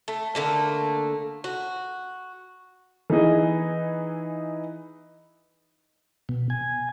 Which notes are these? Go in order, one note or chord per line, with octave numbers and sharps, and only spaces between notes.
A3
D3 A3 A#3
F#4
E3 B3 D#4 E4 G#4 D#5
B2
G#5